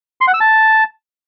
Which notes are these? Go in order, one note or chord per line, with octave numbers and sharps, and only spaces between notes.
C6
F#5
E6
A5